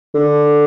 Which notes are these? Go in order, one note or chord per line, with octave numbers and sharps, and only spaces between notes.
D3